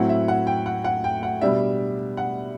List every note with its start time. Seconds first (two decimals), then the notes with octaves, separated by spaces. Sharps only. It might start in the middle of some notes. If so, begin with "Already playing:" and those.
Already playing: A2 F#3 C4 E4 F#5
0.09 E5
0.28 F#5
0.47 G5
0.66 F#5
0.85 F#5
1.04 G5
1.23 F#5
1.42 B2 G3 D4 E5
2.17 F#5